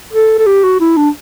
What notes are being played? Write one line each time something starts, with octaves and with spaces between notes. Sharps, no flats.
A4
A4
G4
F#4
E4
D4